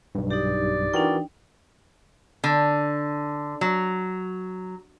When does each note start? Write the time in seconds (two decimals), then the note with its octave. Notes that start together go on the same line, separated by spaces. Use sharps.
0.15 B1 G2
0.31 D#4 G4 D5
0.94 E3 D4 D#4 F#4 A#4 G5
2.44 D3
3.61 F#3